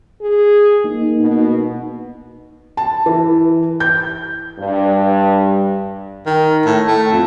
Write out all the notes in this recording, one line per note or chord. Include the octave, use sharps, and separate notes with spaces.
G#4
A#3 D#4
B2
A5
E3
G6
G2
D#3
A2
A3
F2